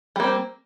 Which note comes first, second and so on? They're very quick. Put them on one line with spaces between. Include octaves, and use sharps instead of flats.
G3 A#3 C4